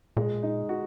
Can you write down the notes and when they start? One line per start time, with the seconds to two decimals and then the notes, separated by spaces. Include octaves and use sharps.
0.17 A#2 G#3
0.43 D#4
0.69 F#4